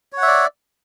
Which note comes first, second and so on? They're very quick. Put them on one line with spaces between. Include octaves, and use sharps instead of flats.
C#5 F#5 E5 D5